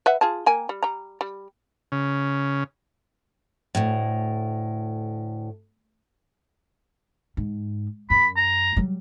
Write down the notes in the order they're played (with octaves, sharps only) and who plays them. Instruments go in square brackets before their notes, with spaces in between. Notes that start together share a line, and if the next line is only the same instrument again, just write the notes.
[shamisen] B4 E5 F#5
F4 G#4 A5
A#3 G5 G#5
G3
G3 A#5
G3
[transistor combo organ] C#3
[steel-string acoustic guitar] D2 A2
[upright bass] G#2
[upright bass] F#2 [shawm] B5
[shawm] A#5
[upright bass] F#3 G3